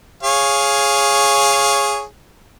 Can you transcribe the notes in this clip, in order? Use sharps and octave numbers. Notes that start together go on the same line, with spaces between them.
G#4 C#5 F5